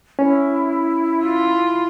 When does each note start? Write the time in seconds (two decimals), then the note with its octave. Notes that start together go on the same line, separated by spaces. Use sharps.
0.19 C#4 E4
1.24 F4